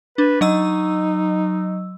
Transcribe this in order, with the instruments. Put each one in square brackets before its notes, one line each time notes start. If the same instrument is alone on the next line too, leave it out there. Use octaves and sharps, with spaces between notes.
[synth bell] D4 [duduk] B4
[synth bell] F#3 D#5 E6 [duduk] D#4